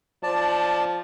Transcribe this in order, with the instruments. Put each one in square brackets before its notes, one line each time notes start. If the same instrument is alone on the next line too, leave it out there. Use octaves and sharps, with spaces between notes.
[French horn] F3 [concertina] D5 A5